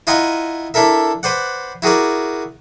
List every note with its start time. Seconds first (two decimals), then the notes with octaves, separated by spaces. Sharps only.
0.07 E4 F4 D#5 F#5 G#5 A#5
0.74 D4 E4 A4 A#4 E5
1.23 B4 C5 D5 F#5
1.82 E4 F#4 G#4 A#4 D5